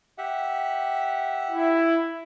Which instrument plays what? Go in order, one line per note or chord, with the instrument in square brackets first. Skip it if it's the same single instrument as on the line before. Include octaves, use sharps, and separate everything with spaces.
[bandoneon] G4 E5 F#5
[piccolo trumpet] E4